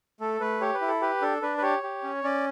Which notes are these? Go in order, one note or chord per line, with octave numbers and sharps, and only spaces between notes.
A3 A4
A3 B4
G4 C#5
B4
E4
A4
G4 B4
D4 A4
D4 B4
B4
G4 C#5
G4
C#4
C#4 D5